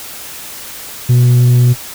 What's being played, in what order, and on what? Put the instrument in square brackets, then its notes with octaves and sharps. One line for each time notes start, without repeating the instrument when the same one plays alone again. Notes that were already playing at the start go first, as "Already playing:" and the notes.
[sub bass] B2